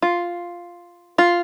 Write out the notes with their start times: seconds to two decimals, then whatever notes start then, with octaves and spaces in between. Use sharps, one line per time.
0.02 F4
1.18 F4